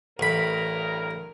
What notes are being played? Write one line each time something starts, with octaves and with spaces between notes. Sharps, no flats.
A1 G2 A#4 B5